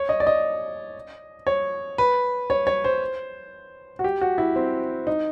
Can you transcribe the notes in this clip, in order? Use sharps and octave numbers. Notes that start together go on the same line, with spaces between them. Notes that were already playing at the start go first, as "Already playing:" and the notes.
Already playing: C#5
D#5
D5
D#5
C#5
B4
C#5
C#5
C5
F#4
G4
F#4
E4
C4
D#4